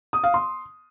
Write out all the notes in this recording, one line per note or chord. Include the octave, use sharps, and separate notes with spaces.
D#6
F5
C6